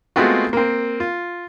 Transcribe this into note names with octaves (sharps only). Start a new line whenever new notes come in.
G#3 A3 B3 C4 F4 F#4
A#3 C4
F4